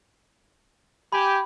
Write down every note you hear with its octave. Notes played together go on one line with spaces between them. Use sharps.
G4 G#5 B5